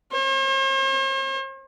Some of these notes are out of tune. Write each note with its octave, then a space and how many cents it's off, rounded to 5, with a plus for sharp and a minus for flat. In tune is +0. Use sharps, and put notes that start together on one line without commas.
C5 +45